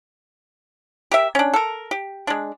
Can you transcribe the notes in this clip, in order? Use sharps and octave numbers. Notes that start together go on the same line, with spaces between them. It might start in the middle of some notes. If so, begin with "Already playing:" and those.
G4 A#4 E5
C#4 D4
A4 A#4
G4
G#3 D4